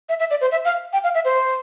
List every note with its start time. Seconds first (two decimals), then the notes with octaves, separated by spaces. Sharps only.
0.09 E5
0.20 E5
0.31 D5
0.41 C5
0.52 E5
0.65 F5
0.93 G5
1.04 F5
1.15 E5
1.25 C5